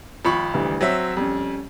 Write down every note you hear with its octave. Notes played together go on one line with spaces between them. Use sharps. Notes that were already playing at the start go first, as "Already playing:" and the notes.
G#1 F3 B5 C#6
D2 E3 G3
F#3 C4 C#5 E5
F2 G3 C#4